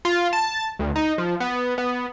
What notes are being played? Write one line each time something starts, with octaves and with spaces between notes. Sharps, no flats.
F4
A5
D2
D#4
F3
B3
B3